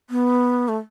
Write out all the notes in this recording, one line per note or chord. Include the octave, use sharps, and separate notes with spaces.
B3
A3